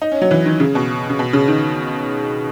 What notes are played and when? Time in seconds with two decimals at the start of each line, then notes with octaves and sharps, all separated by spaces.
0.02 D#4
0.12 C#4
0.21 F#3
0.31 E3
0.46 D#3
0.60 C#3
0.75 B2
1.09 C#3
1.19 B2
1.33 C#3
1.48 D#3